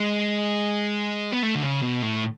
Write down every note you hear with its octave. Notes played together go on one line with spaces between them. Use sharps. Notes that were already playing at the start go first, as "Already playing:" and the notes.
Already playing: G#3
B3
A3
D3
C#3
B2
A2